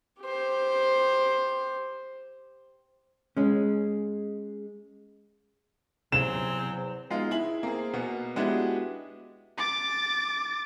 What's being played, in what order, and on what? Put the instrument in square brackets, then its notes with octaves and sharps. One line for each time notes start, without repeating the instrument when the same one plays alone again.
[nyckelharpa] G4 C5
[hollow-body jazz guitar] G#3 C#4
[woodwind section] E2 F#3 [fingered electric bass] C3 [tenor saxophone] C4 [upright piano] E7
[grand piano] G#3 B3 D#4 F4
E4 G#4 F#7
A#3 C4 G#4
B2 A#3 B3
G#3 B3 D4 E4 F#4 G4
[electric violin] D6 A6